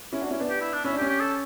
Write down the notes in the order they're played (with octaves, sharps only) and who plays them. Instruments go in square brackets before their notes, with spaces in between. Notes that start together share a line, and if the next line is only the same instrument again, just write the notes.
[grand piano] C#4 E4
D4 F#4
C#4 E4
B3 D4
[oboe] G4
E4
D4
[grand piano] C#4 [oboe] E4
[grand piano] D4
[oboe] G4
[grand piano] C#4
[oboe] G4
A4